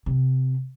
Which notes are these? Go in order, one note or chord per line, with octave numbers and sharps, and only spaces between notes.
C3